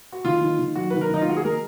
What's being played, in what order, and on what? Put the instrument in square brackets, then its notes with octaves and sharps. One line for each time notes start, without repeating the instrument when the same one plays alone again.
[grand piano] F#4
[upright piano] D#3 [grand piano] F4
[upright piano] D#3
D#3
[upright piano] F#3 [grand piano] F#4
[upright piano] D#3 [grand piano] B4
[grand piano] A#4
[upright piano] D#3 [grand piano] D#4
[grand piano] F4
[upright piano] G#3 [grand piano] F#4
[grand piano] G#4
[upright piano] G#3 [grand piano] A#4